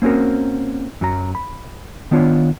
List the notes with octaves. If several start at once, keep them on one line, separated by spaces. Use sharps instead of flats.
A#3 C4 C#4 F#4 A#4
F#2 F#3 A#5
B5
D#3 B3 D4 F4 C#5